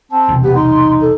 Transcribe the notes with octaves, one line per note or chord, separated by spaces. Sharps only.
C4 A5
B1 E2 C3
B3 G4
D#4 C6
A4